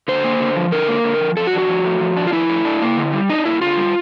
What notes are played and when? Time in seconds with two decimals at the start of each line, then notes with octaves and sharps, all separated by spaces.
0.08 D3 C5
0.24 A#3
0.40 D3
0.56 F3
0.72 D3 A#4
0.88 A#3
1.04 D3
1.21 F3
1.37 F3 A4
1.47 F#4
1.53 D4
1.58 F#4
1.69 F3
1.85 A3
2.01 F3
2.17 D4
2.27 F4
2.33 F3 E4
2.49 A3
2.65 D4
2.82 A#3
2.97 D3
3.13 G3
3.29 D4 D#4
3.45 A#3 E4
3.61 D3 F4
3.78 G3